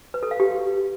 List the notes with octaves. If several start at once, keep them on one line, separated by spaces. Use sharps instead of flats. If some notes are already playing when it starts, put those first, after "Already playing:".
B4
A4
F5
G4